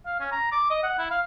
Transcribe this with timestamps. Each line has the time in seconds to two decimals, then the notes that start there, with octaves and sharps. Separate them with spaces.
0.06 F5
0.20 C#4
0.32 A#5
0.52 D6
0.70 D#5
0.84 F#5
0.98 E4
1.11 F5